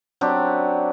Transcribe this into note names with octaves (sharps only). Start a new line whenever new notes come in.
F#3 C4 D4 G4